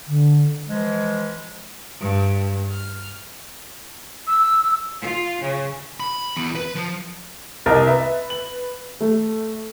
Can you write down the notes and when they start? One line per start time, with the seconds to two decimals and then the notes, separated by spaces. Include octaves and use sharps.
0.07 D3
0.68 E3 F3 G#3
2.02 G2
2.72 F6
4.27 E6
5.01 F4
5.41 C#3
6.00 B5
6.37 E2
6.55 B4
6.75 F3
7.66 C2 A#4 D#5 A#5 A6
7.87 B4 E5
8.30 F#7
9.01 A3